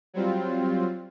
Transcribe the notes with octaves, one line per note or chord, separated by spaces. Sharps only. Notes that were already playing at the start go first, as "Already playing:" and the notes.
F#3 G3 C4 F4